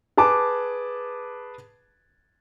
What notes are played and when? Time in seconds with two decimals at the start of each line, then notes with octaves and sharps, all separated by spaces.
0.17 G#4 B4 A5 D6